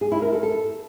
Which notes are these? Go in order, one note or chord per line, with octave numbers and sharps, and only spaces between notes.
G#4
E4
A#4
A4
A4